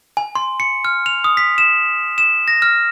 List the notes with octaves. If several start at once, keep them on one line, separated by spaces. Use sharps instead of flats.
G#5
C6
C#7
F6
F7
D#6
B6
E7
E7
A#6
F6